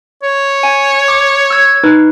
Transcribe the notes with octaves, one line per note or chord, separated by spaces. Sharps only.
C#5
G#5
D6
E6 G#6
D#4 B4